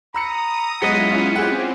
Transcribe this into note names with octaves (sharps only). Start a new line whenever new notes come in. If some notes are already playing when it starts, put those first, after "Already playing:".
A#5 B5 D#6 E6 C#7
F#3 G#3 B3 C#4 E4 F4 D#5 F#5
C4 G4 G#4 F#5